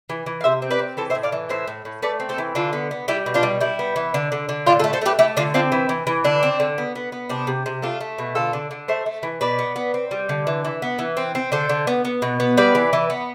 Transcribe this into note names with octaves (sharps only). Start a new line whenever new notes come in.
E3
E3
F5
C3 C5 E5
C4
B4 D5
C4
E3 A4 C5
C5 E5
A2
D5 F5
E3
A2 C5 E5
A2
A2
A3 B4 D5
C4
A4 C5
E3
D3 F4 A4
B3
B3
G3 E4 G4
B2
D4 F4
G3
G3 E4
B3
E3
D3
D3
D3
A2 D4 F4
F4 A4
A3
A4 C5
A3 G4 B4
A3 E4 G4
D3 D4 F4
C4 D4 F4
E3 E4
E3
E3
D3 D4
C4
D3
B3
B3
B3
C3 D4
C3
C3
A3 D4 F4
A3
B2
D3 F4 A4
D3
D3
A3 C5 E5
A3
E3
B2 B4 D5
B3
B3
C4
G3
D3
E3
E3
B3
E3
C4
C4
D3 A4 C5
D3
B3
B3
B2
B3
G3 B4 D5
E3
E3
B3